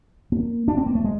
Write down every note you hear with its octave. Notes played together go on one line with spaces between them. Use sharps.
A#3
D4
C4
A#3
A3
G#3